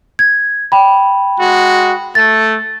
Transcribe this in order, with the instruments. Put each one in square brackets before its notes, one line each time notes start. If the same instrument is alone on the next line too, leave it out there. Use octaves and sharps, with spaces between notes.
[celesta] G#6
G5 B5
[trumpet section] G#3 F#4
[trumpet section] A3 [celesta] A6